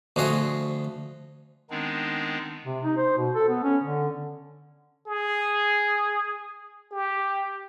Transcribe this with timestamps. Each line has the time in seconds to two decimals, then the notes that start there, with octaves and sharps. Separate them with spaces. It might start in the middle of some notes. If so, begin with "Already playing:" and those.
0.16 D2 F3 F#4 G#4 E5
1.70 D#3 G#3 B3 C4 D4 D#4
2.66 C3
2.84 D#4
2.97 C5
3.18 B2
3.35 A4
3.49 B3
3.63 C#4
3.84 D3
5.07 G#4
6.92 G4